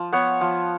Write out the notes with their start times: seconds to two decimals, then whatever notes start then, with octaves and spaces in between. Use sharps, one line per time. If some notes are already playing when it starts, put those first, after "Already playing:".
Already playing: F3
0.13 B3 C#5
0.41 F3